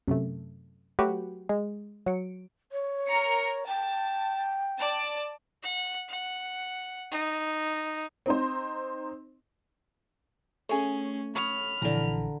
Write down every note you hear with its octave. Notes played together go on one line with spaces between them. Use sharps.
F#2 C3 A3
F#3 A3 F#4 G4 B4
G#3
F#3 C#7 D7
C#5
A#4 A#5 C#7
G5 A5
D5 A5
F#5
F#5
D#4
C4 D#4 C5
A3 C#4 G#4 C#5
C#5 B5 D#6 F6
A#1 D3 E3 A#5